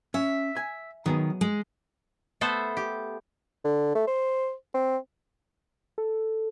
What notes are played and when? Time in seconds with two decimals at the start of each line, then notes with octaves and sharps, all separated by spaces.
0.14 C#4 E5
0.56 G#5
1.06 D#3 F#3 B3 G#4
1.41 G#3
2.41 A3 B3 A4 C5
2.77 G4
3.64 D3
3.95 A3
4.07 C5
4.74 C4
5.98 A4